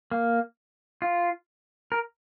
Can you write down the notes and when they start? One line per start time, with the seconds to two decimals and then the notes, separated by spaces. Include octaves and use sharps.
0.11 A#3
1.02 F4
1.92 A#4